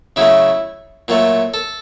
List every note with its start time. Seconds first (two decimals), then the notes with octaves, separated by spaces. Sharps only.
0.16 C#3 F#3 A3 E4
1.08 A#2 F#3 A3
1.54 A4